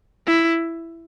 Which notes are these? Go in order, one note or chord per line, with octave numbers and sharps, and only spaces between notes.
E4